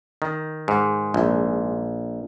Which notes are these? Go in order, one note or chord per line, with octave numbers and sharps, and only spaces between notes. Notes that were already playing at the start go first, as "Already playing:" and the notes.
D#3
G#2
A#1